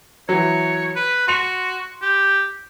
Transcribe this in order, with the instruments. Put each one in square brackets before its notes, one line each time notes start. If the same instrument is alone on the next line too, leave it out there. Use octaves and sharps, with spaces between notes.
[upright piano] E3 F#3 [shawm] C#5
[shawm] B4
[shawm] F#4 [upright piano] C6 C#7 F7
[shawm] G4